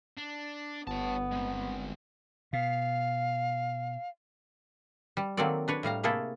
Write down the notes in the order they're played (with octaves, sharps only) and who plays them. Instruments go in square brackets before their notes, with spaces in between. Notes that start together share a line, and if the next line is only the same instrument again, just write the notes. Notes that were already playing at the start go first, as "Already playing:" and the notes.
[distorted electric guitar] D4
[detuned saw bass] G1 [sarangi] B3 [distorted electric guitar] C#5 A5
[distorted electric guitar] G#3 C4
[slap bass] B2 [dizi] F5
[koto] G3
D#3 F#3 A#3 C4 A4 D5
D4 B4 C#5
A2 G3 F5 A#5
C3 A3 A#3 E4 G#4 A4